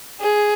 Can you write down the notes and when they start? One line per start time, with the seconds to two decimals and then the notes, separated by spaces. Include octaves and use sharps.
0.20 G#4